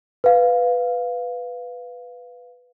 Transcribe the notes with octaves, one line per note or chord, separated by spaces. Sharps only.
B4 F5